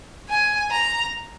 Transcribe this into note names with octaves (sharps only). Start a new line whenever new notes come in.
G#5
A#5